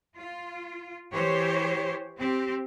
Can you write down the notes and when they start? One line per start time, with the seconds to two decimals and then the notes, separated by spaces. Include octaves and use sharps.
0.16 F4
1.13 E3 G4 C5 C#5
2.18 C4 G4